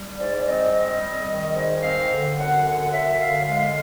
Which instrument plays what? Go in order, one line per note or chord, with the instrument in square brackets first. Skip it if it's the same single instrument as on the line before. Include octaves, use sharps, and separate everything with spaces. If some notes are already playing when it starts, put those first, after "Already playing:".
Already playing: [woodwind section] G3
G#2 D5
D5
C4 D#5
G3 D#5
G3
D#3
G#2
C4 F5
D3
F#2 F#5
D3 F#5
F#2 E5
D3 F5
G#3 F5